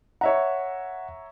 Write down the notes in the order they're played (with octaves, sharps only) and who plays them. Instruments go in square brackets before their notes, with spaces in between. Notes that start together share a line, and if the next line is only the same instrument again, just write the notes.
[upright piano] C#5 E5 A#5 [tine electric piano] F#5